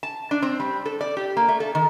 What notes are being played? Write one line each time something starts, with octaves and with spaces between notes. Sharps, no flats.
A5
D4
C4
G3
A4
D5
G4
A#3
A3
A4
D#3